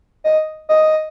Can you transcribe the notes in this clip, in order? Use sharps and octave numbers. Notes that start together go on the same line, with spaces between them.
D#5
D#5